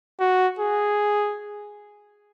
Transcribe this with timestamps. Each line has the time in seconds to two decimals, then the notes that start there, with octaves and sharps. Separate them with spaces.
0.20 F#4
0.59 G#4